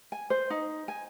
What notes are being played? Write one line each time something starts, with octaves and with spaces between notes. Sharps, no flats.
G#5
C5
D#4
G#5